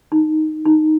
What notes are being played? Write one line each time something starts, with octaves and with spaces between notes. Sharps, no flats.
D#4
D#4